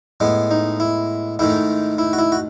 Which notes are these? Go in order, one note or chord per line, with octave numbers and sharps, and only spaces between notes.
A2 G#3 B3
D#4
E4
G#2 D#3 A3 E4
E4
F#4
E4
F#4